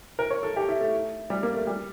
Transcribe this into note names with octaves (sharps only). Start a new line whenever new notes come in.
A#4
C#5
A4
G4
E4
A3
G3
A#3
A3
G3